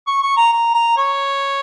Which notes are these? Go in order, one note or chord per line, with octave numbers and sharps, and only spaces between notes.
C#6
C#6
A#5
A#5
A#5
C#5